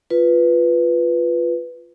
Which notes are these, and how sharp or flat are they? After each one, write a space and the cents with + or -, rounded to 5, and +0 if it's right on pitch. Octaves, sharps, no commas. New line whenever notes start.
F4 +0 B4 +0